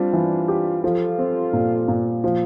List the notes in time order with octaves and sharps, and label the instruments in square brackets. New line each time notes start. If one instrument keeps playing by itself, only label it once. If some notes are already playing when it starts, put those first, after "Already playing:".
Already playing: [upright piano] G3 C4 [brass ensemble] D4 F4
[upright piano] E3
G4
[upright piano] F3 [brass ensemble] F4 A4
[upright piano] C4
A#2
A#2
F3